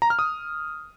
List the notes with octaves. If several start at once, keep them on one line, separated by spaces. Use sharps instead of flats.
A#5
F6
D#6